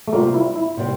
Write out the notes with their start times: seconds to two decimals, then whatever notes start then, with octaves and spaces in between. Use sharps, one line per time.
0.08 A3
0.13 C3 G3 A#3 C4 F4
0.34 E4
0.56 E4
0.77 C3 G3 C4